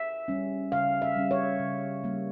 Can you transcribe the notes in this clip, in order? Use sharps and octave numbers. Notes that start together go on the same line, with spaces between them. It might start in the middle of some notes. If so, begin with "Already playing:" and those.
Already playing: E5
G3 C#4
C#3 F5
E5
G3 C#4
C#5
C#3
G3 A#3